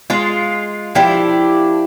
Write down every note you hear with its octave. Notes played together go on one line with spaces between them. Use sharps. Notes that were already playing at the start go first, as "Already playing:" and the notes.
G#3 F4
F3 D4 E4 G4